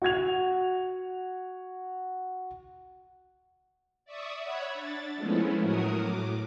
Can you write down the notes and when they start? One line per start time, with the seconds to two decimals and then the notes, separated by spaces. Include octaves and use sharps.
0.02 F#4 F#5 G#6 F7
4.05 D5 E5 C#6 D#6
4.41 C#5 E5 F#5 B5 G#6
4.74 D4 A6
5.16 F3 G#3 A3 B3 C#4 E4
5.61 A2 F#3 F#4 A#4 D#6
5.97 A2 D6